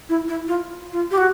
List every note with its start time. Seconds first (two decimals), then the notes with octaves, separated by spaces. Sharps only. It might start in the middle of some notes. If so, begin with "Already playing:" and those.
0.09 E4
0.28 E4
0.48 F4
0.92 F4
1.11 G4
1.18 F#4